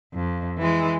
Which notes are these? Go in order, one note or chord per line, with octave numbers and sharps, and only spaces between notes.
F2
E3 G#3